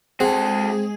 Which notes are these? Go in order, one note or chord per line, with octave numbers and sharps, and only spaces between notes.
G#3 C4 F#4 G#4 A4